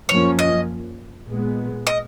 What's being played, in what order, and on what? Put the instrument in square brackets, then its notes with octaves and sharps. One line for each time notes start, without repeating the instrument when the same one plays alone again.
[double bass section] F#2 F3 A#3 C#4 [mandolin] C#5
[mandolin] D#5
[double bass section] A#2 G#3 B3
[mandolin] D#5